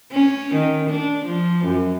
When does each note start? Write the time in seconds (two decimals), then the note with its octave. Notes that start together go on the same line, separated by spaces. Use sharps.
0.11 C#4
0.54 D#3
0.89 D4
1.25 F3
1.65 F#2